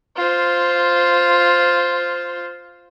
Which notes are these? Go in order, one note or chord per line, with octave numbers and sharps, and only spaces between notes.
F4 C5